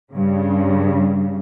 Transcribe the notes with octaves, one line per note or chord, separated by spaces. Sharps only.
G2 C#3